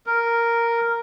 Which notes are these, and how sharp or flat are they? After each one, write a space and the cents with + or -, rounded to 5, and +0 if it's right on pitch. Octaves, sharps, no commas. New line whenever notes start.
A#4 -5